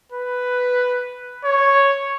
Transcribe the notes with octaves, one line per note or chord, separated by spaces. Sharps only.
B4
C#5